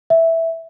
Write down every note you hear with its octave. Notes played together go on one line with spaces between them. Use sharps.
E5